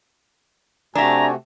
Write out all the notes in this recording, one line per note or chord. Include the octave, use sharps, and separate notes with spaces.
C3 A3 D4 F#4 E5 G#5 A#5